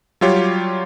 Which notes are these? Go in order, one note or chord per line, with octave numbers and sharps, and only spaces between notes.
F#3 G3 F4 G4 C#5